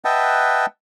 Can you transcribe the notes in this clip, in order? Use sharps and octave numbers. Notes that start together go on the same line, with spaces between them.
B4 D#5 E5 F#5 G5 A5